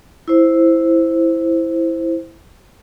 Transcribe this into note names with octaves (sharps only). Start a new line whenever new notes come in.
E4 C5